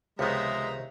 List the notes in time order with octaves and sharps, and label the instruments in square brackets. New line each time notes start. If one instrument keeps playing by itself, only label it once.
[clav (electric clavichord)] C#2 F3 B3 [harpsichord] C3 D#3 [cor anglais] G#3 [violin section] E5 A#5